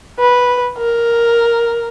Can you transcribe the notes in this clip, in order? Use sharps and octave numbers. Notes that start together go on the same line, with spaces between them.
B4
A#4